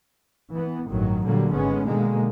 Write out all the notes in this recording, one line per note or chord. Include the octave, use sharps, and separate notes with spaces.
E3 B3
A1 G2 D#3 F#3
A#2 D3 F#3 G3 A#3
G#1 G#3 B3 C#4
B2 D3 D#3 G#3 A#3